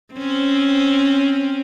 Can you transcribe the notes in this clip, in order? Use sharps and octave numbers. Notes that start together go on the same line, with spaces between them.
C4 C#4